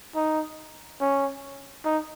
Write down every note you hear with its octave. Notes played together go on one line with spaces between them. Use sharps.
D#4
C#4
D#4